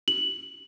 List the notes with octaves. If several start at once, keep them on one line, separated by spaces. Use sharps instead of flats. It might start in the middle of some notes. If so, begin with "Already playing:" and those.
F#7